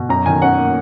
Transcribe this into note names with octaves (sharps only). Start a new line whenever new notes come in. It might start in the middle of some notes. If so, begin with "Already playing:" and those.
Already playing: B2
F#2 A#5
D#3 G#5
C#4 F#5
A#3